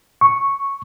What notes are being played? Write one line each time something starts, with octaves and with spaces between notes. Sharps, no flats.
C#6